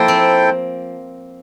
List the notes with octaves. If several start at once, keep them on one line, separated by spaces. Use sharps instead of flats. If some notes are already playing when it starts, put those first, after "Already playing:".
Already playing: F3 A#3 E4 A4 C5 G5
C4